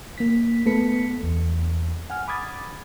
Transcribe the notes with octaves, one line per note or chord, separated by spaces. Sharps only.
A#3 B6
A3 B3 A4 B4 B6 C#7
E2
F#5 G#5 F6
B5 D6 D#6 G#6 A6